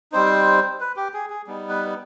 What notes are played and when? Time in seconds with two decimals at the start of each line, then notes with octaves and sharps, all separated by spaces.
0.12 G3 C4 D#4 C5
0.80 B4
0.96 G4
1.14 G#4
1.30 G#4
1.47 G3 B3 D#4
1.69 B4